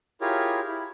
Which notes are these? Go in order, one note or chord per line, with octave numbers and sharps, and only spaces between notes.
E4 F4 G4 G#4 A#4 C#5
E4